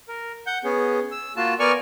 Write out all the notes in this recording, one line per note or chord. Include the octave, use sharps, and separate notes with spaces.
A#4
F#5 G6
B3 C#4 G#4
E6
A#3 F4 F#4 A5
B3 A#4 D5 G#5 C#6 F6